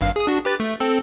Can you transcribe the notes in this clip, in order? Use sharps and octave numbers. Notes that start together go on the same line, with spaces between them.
G#1 G2 F5
G#4 D#6
D4 F#4
G4 B4 A6
A3
C4 A4